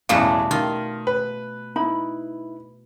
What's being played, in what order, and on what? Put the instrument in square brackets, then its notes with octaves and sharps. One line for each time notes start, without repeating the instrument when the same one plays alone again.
[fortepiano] A1 E2 [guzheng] B2 G3 A3 [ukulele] F5
[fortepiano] D#3 [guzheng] F4
[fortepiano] B4
[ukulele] D#4 E4 B5